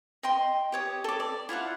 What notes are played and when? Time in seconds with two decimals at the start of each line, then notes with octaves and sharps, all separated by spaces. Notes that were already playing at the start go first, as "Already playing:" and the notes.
0.23 D#5 G5 C6
0.72 G4 C#5 D#6
1.04 A4 D6
1.20 D5
1.49 E4 F4 D5 F#5